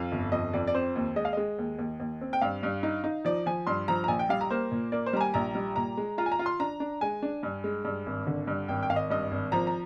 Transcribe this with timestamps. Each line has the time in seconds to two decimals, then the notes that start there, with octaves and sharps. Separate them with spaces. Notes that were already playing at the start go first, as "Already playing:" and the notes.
Already playing: F2 F5
0.12 G1
0.32 F2 D#5
0.53 F2 D5
0.67 D5
0.74 C4 C5
0.96 D#2
1.16 G#3 D#5
1.25 F5
1.33 G#3 D#5
1.58 D#2
1.78 D#2
2.00 D#2
2.21 C4
2.33 G5
2.41 G2 F5
2.63 G2
2.83 D#4
3.04 D#4
3.25 F3 D5
3.46 F3 G#5
3.67 G2 C6
3.88 F3 A#5
4.04 A#5
4.08 A#1 G#5
4.19 G5
4.29 G3 F5
4.41 A#5
4.51 A#3 C5
4.71 A#2
4.92 A#3 D5
5.06 C5
5.13 G3 A#5
5.21 G#5
5.34 A#1 A#5
5.55 G3
5.76 A#2 A#5
5.97 G#3
6.18 F4 A#5
6.26 G#5
6.32 A#5
6.39 F4
6.46 C6
6.60 D4 A#5
6.80 D4
7.01 G#3 G#5
7.23 D4
7.43 G2
7.64 G#3
7.85 G2
8.06 G#1
8.27 D3
8.47 G2
8.68 G#1 G5
8.83 G5
8.89 G#1 F5
8.96 D#5
9.10 G2 D#5
9.32 G#1
9.52 F3 A#5
9.67 A#5